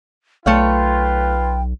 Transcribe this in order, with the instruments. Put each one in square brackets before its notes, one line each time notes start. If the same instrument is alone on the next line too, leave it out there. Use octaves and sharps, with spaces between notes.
[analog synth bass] B1 [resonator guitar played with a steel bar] A3 C#5 F5 [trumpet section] F4 B4 [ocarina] G5